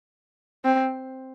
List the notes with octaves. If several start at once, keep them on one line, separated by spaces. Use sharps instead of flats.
C4